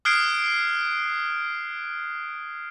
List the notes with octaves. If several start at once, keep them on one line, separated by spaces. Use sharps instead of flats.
D#6 F6 F#6 G#6 C7 D7